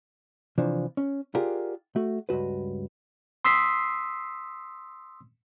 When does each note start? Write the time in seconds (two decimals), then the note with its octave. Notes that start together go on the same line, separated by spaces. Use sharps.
0.58 C3 E3 F3 D4
0.97 C#4
1.35 F4 G4 G#4 A#4 D5 F#5
1.96 A3 F#4
2.29 C#2 G2 B2 F#4 B4
3.45 C6 D#6 E6 B6 C7